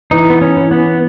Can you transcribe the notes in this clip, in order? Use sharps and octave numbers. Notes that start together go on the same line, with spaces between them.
E3 D#4
B3
C#4
E3
B3